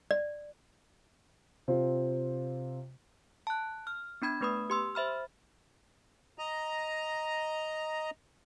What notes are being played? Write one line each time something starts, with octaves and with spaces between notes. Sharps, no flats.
D5
C3 C4 F4
A5 F#6
F6
B3 D4 B5 G#6
A3 B3 B4 B5 D#6
G4 C6 E6
C5 E5 B5 F6
D#5 A#5